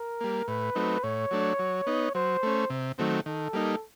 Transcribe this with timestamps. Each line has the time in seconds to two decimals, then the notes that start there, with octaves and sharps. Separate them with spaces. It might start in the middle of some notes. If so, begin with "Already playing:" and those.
Already playing: A#4
0.21 G3 A#3
0.48 A2 B4
0.75 F#3 A3 C4 D#4
1.04 A2 C#5
1.31 F#3 A3 D4
1.59 F#3
1.87 B3 D#4
2.15 F#3 C5
2.43 A3 C#4
2.70 C3
2.98 D#3 F#3 A3 C4
3.26 D#3 A4
3.53 G3 A#3 D#4